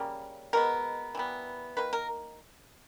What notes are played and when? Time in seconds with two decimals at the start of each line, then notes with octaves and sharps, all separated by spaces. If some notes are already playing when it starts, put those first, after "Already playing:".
Already playing: C#3 G3 A#3
0.53 B2 G#3 B3 A#4
1.15 E3 G3 B3
1.77 D#3 A#3 B4
1.93 A#4